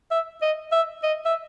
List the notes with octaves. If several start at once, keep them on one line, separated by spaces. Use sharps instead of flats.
E5
D#5
E5
D#5
E5